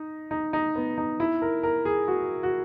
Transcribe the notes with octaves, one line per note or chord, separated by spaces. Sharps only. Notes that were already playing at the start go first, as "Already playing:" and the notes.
Already playing: D#4
D#4
D#4
B3
D#4
E4
A#4
A#4
G#4
F#4
F#4